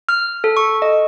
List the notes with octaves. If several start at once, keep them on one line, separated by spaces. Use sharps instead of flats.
F6
A4
C#6
D#5